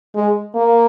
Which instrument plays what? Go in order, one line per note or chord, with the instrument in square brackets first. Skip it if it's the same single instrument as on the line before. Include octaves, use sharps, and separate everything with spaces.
[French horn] G#3
A#3